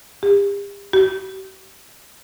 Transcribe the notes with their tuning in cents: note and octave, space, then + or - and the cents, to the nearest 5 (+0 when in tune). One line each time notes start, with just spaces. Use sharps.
G4 +40
G4 -45